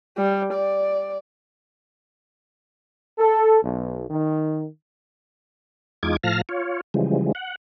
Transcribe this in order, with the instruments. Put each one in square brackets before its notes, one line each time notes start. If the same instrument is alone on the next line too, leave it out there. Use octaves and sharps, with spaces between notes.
[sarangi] G3
D5
[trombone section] A4
B1
D#3
[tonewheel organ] E2 G#3 D#4 F4 D6 G#6
A2 F3 F5 A5 F6 A#6
F4 C#5
C#3 E3 F3 G3 G#3
F#5